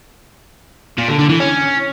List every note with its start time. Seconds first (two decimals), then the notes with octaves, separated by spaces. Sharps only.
0.98 A#2
1.08 D3
1.19 D3
1.29 E3
1.40 C#4